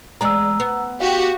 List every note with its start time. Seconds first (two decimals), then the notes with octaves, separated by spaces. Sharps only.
0.21 E2 G#3 D5 A#5 E6
0.60 B3
1.00 F#4 G4 F5